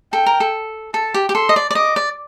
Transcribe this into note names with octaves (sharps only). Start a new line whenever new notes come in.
A4 G5
A#4
A4
A4 A5
G4
G4
A4 C6
D#5
D5
D5
D#5 D6
D5